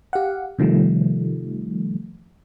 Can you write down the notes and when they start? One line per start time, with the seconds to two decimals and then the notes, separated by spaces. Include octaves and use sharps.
0.13 G4 F5 F#5
0.59 C3 D#3 F3 G3 A3